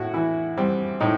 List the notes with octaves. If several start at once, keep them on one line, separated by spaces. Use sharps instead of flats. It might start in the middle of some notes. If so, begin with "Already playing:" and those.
Already playing: A2 E4 F#4
E3 E4
G3 C4
A2 D#4